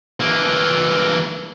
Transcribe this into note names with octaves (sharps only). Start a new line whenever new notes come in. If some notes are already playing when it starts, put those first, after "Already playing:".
E3 A#3